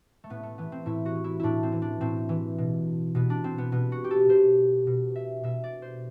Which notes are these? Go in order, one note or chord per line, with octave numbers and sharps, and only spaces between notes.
A3
A2 B3
A3
E3 B3
C4
A2 E4
F#4
E3
E4
A2 D4 E4
C4
E3
D4
A2 C4
E3
B2
B2 B3
D4
C4
B3
B2 B3
F#4
G4
A4
B2 C5
B2
E5
B2 E5
D5
C5